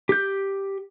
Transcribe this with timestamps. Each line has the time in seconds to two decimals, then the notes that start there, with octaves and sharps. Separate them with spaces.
0.09 G4 G6